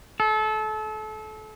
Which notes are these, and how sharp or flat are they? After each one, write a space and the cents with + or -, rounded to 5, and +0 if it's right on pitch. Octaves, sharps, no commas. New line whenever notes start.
A4 -30